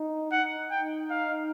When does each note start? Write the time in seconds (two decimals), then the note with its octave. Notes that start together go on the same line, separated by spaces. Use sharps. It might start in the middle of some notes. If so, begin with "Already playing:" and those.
Already playing: D#4
0.31 D#4 F#5
0.71 G5
1.10 F5